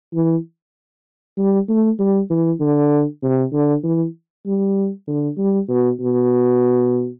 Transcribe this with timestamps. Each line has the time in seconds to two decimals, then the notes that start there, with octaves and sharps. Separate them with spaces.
0.14 E3
1.38 G3
1.69 A3
1.99 G3
2.30 E3
2.60 D3
3.23 C3
3.53 D3
3.84 E3
4.46 G3
5.08 D3
5.38 G3
5.69 B2
6.00 B2